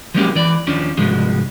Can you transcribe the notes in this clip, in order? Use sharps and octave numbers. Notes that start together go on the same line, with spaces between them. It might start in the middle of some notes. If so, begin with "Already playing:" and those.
F3 F#3 G#3 A#3 C#4 G4
E3 D5
D#2 F3 C#4 D4
C2 G#2 F3 G#3 F#4